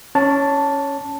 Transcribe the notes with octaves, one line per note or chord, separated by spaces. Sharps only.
C#4 C#5 A5